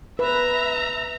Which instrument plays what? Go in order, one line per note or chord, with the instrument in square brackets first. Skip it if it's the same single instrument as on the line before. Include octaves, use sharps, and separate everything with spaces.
[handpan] B4 [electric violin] E5 A#5